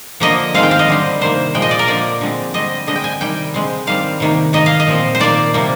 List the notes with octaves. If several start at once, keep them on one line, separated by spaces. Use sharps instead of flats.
D3 F3 A#3 D#5
D#3 G#3 C4 F5
G5
F5
D#5
D3 G3 C4
C3 D#3 A#3 C5
A#2 F3 G#3 G5
D#5
D5
A#4
D3 F3 A#3 D5
D3 G#3 C4
D3 G3 C4 D#5
D3 G#3 C4 D#5
G5
G#5
C3 D#3 G3 G5
D3 G#3 C4
D#3 G3 C4 F5
C3 D#3 A#3
D#3 A#3 D#5
F5
D#5
A#2 F3 C4
C5
D#3 A#3 D5
C3 G3 A#3